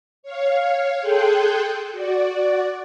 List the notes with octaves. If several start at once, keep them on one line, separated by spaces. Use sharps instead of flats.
C#5 F5
G#4 A4 G5 C6 F#6 G6
F#4 D5